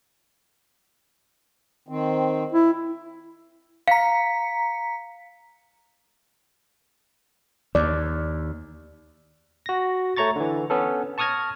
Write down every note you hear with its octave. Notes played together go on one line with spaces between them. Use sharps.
D#3 C4
E4
F5 A#5 B6 C#7
D#2 D5
F#4 A#6
A3 C#5 A#5 C#6 A6
D3 E3
B3 C#4 A4
A5 C#6 D#6 F6 G#6 A#6